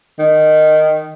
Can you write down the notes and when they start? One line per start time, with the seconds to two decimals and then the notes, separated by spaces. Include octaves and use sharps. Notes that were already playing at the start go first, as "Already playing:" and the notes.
0.19 D#3